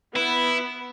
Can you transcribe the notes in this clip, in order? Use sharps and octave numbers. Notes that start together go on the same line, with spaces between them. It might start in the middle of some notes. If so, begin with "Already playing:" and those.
B3 E4